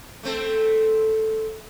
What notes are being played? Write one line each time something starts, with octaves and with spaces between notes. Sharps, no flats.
A3 C4 A4